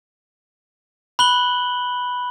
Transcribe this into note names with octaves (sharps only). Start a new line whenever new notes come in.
B5 F#6 F#7 G7